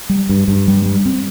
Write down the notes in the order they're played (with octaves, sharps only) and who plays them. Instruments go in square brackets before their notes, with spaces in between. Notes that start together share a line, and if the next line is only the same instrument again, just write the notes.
[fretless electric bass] G3
G2
G2
G3
G3
C4